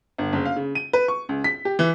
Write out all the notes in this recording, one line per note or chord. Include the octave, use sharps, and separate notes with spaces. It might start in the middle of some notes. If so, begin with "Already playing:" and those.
G1
F#1
F5
C#3
D#7
B4
C#6
C#2
B6
G4
E3